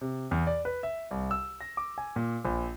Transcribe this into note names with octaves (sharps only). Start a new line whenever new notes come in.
C3
E2
D5
B4
E5
C2
E6
A#6
D6
G#5
A#2
A#1